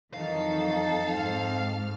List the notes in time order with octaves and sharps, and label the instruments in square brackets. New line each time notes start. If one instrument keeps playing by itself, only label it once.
[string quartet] F2 A4 A5 [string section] D#3 E3 F#3 [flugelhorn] D#4 [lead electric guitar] F5
[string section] G#2 F6 [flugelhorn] C4